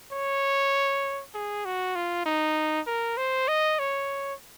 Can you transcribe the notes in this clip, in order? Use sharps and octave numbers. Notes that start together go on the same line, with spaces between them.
C#5
G#4
F#4
F4
D#4
A#4
C5
D#5
C#5